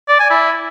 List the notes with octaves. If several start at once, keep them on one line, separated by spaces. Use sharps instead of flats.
D5
G#5
E4